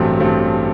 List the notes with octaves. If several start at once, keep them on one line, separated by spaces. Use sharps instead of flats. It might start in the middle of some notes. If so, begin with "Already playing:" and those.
Already playing: A1 G2 F#3 A3 C4
A1 G2 F#3 A3 C4